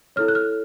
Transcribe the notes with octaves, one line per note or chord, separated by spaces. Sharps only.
E4 A4 C#5 F6
F#6
F6